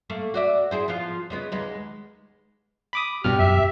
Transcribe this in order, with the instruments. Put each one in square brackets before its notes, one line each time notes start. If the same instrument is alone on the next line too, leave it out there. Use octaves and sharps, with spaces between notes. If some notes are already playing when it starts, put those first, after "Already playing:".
[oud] A3 A#3
F#4 D5 E5
E4 G#4 C5
F3 B3 F4
C#3 G#3 B3
D#2 G#3 B3
[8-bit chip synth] B5 D6 D#6
[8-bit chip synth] G2 B2 F6 [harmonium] G4
[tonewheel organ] F#2 [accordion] E5